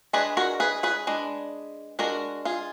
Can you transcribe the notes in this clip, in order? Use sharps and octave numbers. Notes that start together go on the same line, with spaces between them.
G#3 D4 G#4 B4
F#4 A#4
G#4 B4
G#4 B4
G#3 D4
G#3 D4 F#4 A#4
F4 G#4